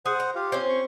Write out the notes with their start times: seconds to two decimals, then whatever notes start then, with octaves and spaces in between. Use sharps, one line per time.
0.06 G#4 C5 F#5
0.20 A#5
0.35 F4 G4 F5
0.52 C4 C#4 C5
0.69 C#6